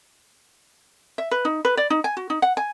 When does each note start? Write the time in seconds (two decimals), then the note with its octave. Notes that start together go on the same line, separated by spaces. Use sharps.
1.18 E5
1.31 B4
1.45 D#4
1.65 B4
1.77 D5
1.90 D#4
2.04 G#5
2.17 F#4
2.30 D#4
2.42 F#5
2.57 G#5